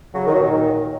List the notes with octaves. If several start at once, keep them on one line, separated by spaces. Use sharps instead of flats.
C#3 F#3
D#3
F#3
A#2 D#3